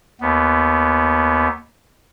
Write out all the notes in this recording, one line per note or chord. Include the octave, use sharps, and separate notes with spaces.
D#2 B3